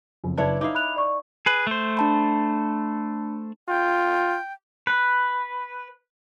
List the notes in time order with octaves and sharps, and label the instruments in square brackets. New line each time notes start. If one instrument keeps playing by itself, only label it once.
[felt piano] F#1 F2
[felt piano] F#1 D5 A5 [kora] D4 E4 C#5 [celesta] B4
[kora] D#4 E4 F5 [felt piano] D6
[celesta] B5 F#6 F7
D5 C#6
[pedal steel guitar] G#4 B4
A3 C5
[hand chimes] D4 A5 B5
[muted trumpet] F4 [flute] G5
[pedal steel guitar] B4